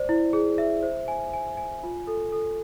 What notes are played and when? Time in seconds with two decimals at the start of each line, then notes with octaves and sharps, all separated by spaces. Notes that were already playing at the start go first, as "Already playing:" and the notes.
Already playing: C5 D5
0.09 E4
0.33 G#4
0.58 E5
0.83 C5
1.08 G#5
1.33 G#5
1.57 G#5
1.83 F4
2.07 A4
2.32 A4